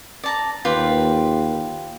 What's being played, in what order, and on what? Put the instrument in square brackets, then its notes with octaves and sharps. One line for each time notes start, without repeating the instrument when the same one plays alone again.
[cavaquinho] D5 A5 A#5
[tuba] D#2 [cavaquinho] F4 G4 B4